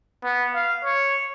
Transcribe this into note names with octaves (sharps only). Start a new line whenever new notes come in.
B3
F5
C#5